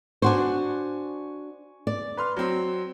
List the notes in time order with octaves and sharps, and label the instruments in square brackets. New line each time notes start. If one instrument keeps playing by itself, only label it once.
[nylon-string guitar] D4 F#4 C5 [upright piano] G#5 C#6
[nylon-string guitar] D5
[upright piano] B4 C6 F6
F#3 C4